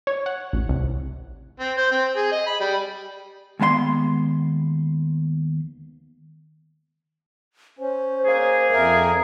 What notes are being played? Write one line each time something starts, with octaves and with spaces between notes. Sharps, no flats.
C#5
F#5
A1
C2
C4
C5
C4
G#4
D#5
B5
G3
D#2 G#3 B3 F5 C6
C#4 C5
A#3 D#4 G#4 C5
F2 A#4 E5